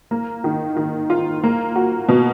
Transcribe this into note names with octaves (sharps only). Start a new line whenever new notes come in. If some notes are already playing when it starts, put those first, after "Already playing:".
A#3
D#3
D#3
F4
A#3
F#4
B2